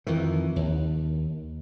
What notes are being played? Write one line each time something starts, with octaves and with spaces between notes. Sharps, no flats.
F2 D#3 E3
D#2